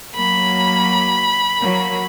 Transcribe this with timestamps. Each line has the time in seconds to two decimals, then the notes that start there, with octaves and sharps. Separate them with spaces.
0.15 F#3 A#3 B5
1.60 F#3 A#3